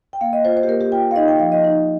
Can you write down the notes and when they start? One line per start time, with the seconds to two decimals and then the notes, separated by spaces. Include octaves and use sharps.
0.13 G5
0.21 A#3 F5
0.33 D#5
0.45 F4 C5
0.57 C5
0.63 G4
0.68 A#3 A#4
0.81 G4
0.92 F4 G5
1.11 F5
1.16 D#4 D#5
1.28 G5
1.39 F3 F5
1.52 D#5
1.64 D#4